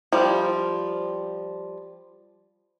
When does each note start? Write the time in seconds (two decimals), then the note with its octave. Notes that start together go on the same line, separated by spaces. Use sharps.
0.12 F3 G3